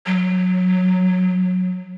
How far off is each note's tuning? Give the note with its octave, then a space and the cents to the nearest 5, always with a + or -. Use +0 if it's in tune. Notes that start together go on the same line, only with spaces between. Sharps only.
F#3 -15